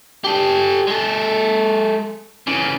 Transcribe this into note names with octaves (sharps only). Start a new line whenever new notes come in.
G4 A4
G#3 A4
C#3 E3